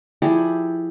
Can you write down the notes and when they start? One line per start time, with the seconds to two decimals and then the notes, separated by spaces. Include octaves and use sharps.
0.22 F3 E4 G4 G#4